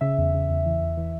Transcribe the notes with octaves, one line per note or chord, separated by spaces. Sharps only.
C#3 E5
E2
C#3
E2
E3
E2
E3